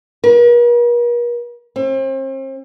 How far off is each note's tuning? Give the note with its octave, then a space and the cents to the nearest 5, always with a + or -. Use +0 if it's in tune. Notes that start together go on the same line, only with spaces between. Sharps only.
A#4 +45
C4 +40